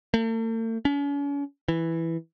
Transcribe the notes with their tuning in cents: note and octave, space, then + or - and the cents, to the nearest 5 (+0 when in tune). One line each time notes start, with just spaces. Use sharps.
A3 +45
C#4 +40
E3 +0